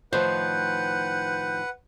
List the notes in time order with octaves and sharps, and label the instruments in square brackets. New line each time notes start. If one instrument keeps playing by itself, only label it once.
[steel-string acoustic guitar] A2 D#3 F3 [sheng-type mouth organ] B4 F#5 [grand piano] C5 [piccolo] G6